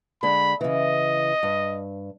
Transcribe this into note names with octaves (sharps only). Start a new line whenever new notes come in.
D3 G#3 D4 B5
C#3 E3 D#5
G2